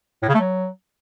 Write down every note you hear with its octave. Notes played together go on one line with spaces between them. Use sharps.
A2
C#3
A3
F#3